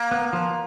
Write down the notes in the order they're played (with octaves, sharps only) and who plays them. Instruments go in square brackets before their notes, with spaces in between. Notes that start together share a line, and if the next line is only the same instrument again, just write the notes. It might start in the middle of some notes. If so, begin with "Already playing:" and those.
Already playing: [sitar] A#3
[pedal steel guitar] B3
F3